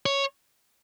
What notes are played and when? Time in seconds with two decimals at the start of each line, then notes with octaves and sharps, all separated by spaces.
0.06 C#5